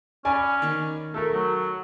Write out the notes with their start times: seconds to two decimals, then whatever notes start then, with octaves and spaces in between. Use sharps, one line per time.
0.25 C#4 D5 G#5 B5
0.62 D#3 C#6
1.14 A3 A4 A#4
1.33 F#3